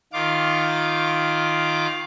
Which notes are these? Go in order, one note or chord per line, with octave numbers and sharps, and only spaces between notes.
D#3 F4 F5 D6